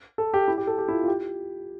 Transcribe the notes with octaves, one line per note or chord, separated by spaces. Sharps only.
A4
G4
E4
G4
A4
G4
E4
F4
F4
G4